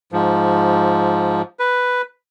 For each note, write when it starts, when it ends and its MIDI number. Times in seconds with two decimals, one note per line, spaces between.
0.12 1.42 44
0.12 1.42 53
1.59 2.02 71